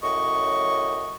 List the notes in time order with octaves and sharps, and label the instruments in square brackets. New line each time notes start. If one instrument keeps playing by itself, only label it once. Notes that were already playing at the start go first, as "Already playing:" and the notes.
[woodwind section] F#2 A2 C#3 D#5 C#6